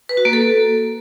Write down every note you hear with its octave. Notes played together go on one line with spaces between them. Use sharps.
B4
F#4
A#3
A4